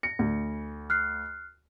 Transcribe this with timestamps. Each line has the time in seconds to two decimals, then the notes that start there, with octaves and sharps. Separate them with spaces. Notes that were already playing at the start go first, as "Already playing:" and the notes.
0.03 A#6 C#7
0.19 D2
0.90 F6 F#6 C7